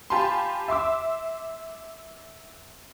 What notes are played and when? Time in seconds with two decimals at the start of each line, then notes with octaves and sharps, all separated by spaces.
0.10 F4 G4 G#5 A5 B5 C6
0.68 E5 C6 D6 E6